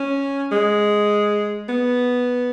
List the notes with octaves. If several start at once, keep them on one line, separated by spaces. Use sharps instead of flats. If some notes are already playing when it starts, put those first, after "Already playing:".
Already playing: C#4
G#3
B3